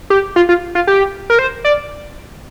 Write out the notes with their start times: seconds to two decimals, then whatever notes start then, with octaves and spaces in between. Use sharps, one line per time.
0.10 G4
0.36 F4
0.49 F4
0.75 F4
0.87 G4
1.30 A#4
1.39 C5
1.65 D5